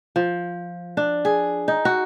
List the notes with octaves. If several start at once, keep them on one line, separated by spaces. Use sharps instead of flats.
F3
D4
G#4
D#4
F#4